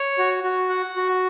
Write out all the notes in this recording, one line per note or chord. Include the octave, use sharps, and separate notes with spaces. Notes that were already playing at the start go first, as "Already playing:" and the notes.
Already playing: C#5
F#4
F#4
F#5
F#4